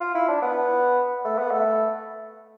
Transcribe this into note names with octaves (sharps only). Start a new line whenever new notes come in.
F4
E4
D4
B3
A3
B3
A3